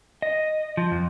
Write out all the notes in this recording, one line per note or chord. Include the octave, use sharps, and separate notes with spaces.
D#5
F3
F2